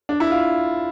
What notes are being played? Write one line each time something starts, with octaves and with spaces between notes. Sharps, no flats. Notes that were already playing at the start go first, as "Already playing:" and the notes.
D4
E4
F4